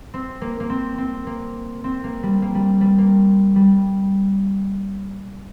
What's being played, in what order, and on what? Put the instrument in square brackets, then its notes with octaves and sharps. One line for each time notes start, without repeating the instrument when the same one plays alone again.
[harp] C4
A#3
A#3
C4
C4
A#3
C4
A#3
G3
A#3
G3
G3
A#3
G3